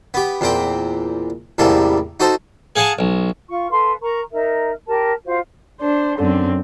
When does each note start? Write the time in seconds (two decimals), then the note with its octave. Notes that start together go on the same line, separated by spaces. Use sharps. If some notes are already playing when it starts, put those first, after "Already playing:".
0.14 B3 G4
0.41 E2 A#2 C4 G5
1.58 A1 E2 C3 G3 A#3 A4
2.20 D#4 F#4 A4 C5 A5
2.76 G#4 F5 F#5 G#5 A5
2.99 B1
3.48 F4 C#6
3.70 A4 B4 F5 C6
4.02 A#4 A#5 C#6
4.32 D#4 A#4 E5
4.87 G4 A#4 A5
5.26 F4 F#4 C5 F5
5.81 D4 C5
6.18 F#2 D3 C4